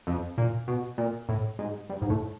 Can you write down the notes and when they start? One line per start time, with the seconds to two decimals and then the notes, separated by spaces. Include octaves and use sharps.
0.07 F2
0.38 A#2
0.68 B2
0.98 A#2
1.29 A2
1.59 G#2
1.90 G2
2.02 G#2
2.10 A2